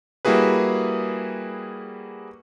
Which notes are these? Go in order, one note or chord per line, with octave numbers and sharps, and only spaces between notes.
G3 A#3 E4 F#4 G#4 B4